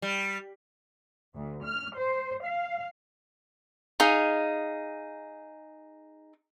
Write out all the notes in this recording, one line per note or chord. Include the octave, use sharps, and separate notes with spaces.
G3
D2
F6
C5
F5
D#4 G#4 F5